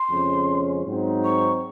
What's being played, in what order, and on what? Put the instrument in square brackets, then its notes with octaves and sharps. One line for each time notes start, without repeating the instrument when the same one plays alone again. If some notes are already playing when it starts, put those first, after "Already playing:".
Already playing: [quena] C6
[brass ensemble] F2 C#3 G#3 C#4
G#2 F#3 C4 D#4
[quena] C#6